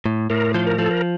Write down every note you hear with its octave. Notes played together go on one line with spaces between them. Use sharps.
A2
A2 A#4
F3 C5
A#4
F3 A4
A#4